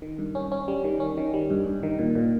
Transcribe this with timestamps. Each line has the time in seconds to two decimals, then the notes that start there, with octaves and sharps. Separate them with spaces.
0.02 D#3
0.19 G2
0.35 C#4
0.52 C#4
0.68 G3
0.84 D#3
1.00 C#4
1.17 D#3
1.34 G3
1.50 G2
1.66 G2
1.83 D#3
1.99 A#2
2.15 A#2